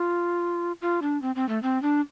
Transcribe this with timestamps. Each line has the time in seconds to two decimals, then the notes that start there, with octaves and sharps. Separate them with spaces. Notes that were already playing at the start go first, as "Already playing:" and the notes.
Already playing: F4
0.81 F4
1.02 D4
1.22 C4
1.35 C4
1.49 A3
1.63 C4
1.82 D4